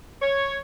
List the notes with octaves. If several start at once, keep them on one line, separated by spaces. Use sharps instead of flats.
C#5